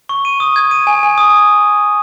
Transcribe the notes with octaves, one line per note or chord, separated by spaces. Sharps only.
C#6
D#7
D#6
G#6
D#7
G#5
G#5
D#6